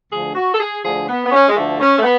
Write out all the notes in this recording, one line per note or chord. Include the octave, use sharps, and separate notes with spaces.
D2 D3 F3 G#4
F#4
A4
G#4
D2 D3 F3 G#4
B3
B3
C#4
G#3
D2 D3 F3 A3
C#4
A3
B3